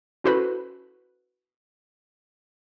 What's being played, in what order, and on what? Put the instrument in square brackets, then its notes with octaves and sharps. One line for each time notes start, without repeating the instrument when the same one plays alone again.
[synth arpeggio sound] C#4 E4 F#4 A4 B4 C5